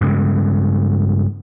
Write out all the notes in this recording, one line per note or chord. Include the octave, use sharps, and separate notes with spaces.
G2 C#3 G#3